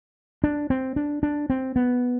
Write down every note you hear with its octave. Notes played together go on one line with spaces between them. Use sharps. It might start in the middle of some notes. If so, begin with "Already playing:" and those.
D4
C4
D4
D4
C4
B3